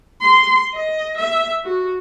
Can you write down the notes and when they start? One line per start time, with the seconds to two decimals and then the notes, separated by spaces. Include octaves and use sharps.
0.21 C6
0.74 D#5
1.18 E5
1.64 F#4